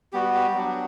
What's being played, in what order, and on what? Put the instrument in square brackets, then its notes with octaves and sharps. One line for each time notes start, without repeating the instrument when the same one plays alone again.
[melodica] G3 B3 F#4 G4
G4
F#3 B3 D4 F#4